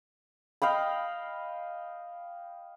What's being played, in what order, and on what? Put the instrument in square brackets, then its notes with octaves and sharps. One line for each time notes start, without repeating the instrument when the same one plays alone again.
[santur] D#5 F5 G5 B5